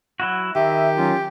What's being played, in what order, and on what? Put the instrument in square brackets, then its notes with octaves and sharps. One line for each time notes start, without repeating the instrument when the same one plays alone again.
[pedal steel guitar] F#3 E4 F#4
[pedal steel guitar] D#3 [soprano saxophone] G4 [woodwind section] E5
[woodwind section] F#3 C#4 F4